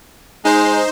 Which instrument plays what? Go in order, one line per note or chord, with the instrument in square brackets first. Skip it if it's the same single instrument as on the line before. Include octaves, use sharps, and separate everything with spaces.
[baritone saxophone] G#3 [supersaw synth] D#4 C5